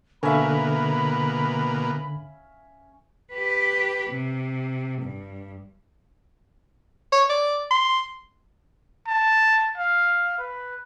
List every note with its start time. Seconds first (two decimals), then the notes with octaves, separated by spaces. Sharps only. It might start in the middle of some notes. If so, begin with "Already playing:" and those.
0.23 B2 D3 A#3 C#4 E5 F5 B5
3.33 G4 B4
4.10 C3
5.02 G2
7.12 C#5
7.29 D5
7.70 C6
9.07 A5
9.78 F5
10.38 B4